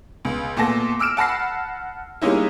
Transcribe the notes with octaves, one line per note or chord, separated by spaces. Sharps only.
C#2
A#2 A3 B3 A5 A#6
D6 E6 F6 D7 E7
F#5 A5 B5 A#6 C7
G3 G#3 A#3 C#4 D#4 E4